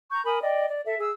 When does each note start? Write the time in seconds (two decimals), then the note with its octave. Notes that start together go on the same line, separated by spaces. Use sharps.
0.12 A#5 C#6 G6
0.26 A#4 G#5 B5 D#6
0.42 D5 D#5 G5
0.69 D5
0.85 A4 E5
0.99 G#4 E6